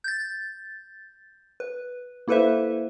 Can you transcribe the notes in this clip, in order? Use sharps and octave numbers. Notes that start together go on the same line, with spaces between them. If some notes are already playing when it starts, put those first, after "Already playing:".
G6 A6
B4
A#3 E4 A4 B4 C5 E5